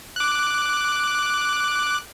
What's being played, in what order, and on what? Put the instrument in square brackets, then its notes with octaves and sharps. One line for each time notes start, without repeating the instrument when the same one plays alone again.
[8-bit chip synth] D6 F#6